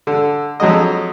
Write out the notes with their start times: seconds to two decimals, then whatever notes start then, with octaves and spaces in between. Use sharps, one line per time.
0.07 D3
0.60 F2 F#3 G#3 D#5